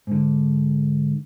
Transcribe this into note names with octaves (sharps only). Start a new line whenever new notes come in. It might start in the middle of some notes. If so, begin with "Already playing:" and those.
G#2 D3